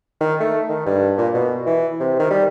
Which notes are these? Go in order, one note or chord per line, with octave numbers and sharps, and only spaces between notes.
D#3
A3
D#3
G2
A#2
B2
E3
C3
D#3
G3